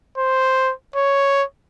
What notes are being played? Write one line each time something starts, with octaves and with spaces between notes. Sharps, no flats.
C5
C#5